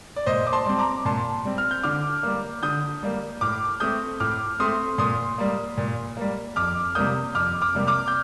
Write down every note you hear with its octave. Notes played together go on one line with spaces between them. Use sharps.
D5
A#2 C5 D#5
D6
A5 C6
G3 C4
A#5 D6
A#2 A5 C6
G3 C4
F6
G6
D3 D6 F6
G3 A#3
D3 D#6 G6
G3 A#3
A2 D6 F6
A3 C4 D#6 G6
A2 D6 F6
A3 C4 C6 D#6
A#2 C6 D#6
G3 A#3
A#2
G3 A#3
F2 D6 F6
C3 G3 A#3 D#6 G6
F2 D6 F6
D6 F6
C3 G3 A#3
D6 F6
G6